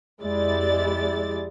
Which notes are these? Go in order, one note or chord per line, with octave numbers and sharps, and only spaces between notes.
F2 G#3 E4 G4 D5 A6